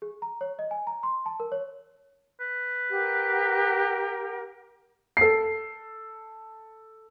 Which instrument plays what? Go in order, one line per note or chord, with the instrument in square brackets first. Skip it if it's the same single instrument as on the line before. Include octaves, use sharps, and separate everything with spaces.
[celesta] G#4
A#5
C#5
D#5
G#5
A#5
C6
A5
A#4
C#5
[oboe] B4
[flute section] G4 A#4 F#5
[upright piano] A4 C7